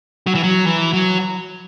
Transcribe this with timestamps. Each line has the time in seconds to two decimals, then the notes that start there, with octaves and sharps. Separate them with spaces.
0.27 F#3
0.35 E3
0.43 F#3
0.67 E3
0.93 F#3